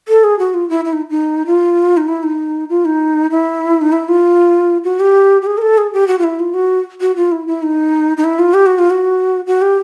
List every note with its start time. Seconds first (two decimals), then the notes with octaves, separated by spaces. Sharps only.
0.08 A4
0.24 G#4
0.39 F#4
0.54 F4
0.70 E4
0.85 E4
0.93 D#4
1.10 D#4
1.46 F4
1.97 D#4
2.08 E4
2.23 D#4
2.70 F4
2.85 D#4
3.31 E4
3.81 D#4
3.92 E4
4.09 F4
4.84 F#4
5.00 G4
5.42 G4
5.47 G#4
5.58 A#4
5.62 A4
5.78 G#4
5.93 G4
6.08 F#4
6.19 F4
6.24 E4
6.40 F4
6.54 F#4
7.01 F#4
7.16 F4
7.32 E4
7.47 E4
7.63 D#4
8.17 D#4
8.24 E4
8.39 F4
8.54 G4
8.66 F#4
8.79 F4
8.90 F#4
9.47 F#4
9.62 G4